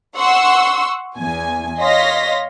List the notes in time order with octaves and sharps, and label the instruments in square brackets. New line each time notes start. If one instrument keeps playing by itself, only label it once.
[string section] F#5 C6 C#6 E6
E2 G#5
C#5 D#5 F5 C6 A#6 B6